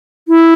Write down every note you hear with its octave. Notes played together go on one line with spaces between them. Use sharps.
E4